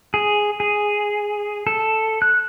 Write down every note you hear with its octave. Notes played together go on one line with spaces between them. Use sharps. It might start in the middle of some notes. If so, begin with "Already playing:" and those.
G#4
G#4
A4
F#6